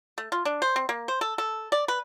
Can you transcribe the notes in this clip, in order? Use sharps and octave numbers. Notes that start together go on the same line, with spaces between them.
A3
F4
D4
C5
C4
A#3
C5
A4
A4
D5
B4